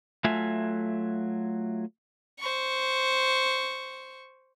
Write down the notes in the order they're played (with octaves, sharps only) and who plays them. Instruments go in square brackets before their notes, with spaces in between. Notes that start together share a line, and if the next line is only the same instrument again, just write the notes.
[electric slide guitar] F#3 A3 F4 E5 G#5
[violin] C5 C#6